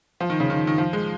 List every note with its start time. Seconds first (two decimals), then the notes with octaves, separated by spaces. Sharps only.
0.20 F3
0.30 D#3
0.40 C#3
0.50 D#3
0.67 D#3
0.78 F3
0.93 G#3